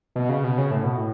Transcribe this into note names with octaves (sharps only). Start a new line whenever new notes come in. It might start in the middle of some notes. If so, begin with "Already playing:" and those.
B2
C#3
B2
C#3
A2
B2
A2